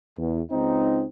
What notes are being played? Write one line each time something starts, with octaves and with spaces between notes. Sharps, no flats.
E2
C#2 C4 D#4